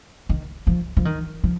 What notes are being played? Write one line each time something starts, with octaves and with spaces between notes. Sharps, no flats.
D#3
F3
F3
D#3
F3